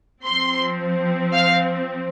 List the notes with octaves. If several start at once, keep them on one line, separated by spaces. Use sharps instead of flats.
F3 C4 C6
F5